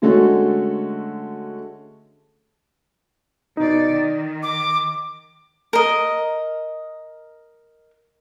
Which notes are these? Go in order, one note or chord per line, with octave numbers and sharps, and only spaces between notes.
D3 G#3 A3 C#4 F#4 A4
B2 D#4 D5
D#3
D6
A#4 D#5